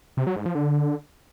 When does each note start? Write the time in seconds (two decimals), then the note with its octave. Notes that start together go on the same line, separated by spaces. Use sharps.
0.17 C3
0.27 F#3
0.36 G#2
0.46 F3
0.55 D3